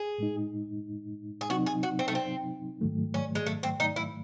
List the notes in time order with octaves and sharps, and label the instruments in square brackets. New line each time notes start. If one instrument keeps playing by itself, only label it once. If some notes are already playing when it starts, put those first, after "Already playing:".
Already playing: [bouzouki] G#4
[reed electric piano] A2 G#3 D#4
[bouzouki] G#4
[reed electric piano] C3 F#3 C4 D#4 [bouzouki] F#4
[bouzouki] G#4
F#4
C4
A3
C4
[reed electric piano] G#2 D#3 F#3 A3
[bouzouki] C#4
G#3
A3
C4
D#4
E4